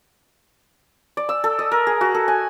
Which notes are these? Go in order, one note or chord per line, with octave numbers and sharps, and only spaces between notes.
D5
E6
A4
D#5
A#4
G#4
F#4
A4
G#5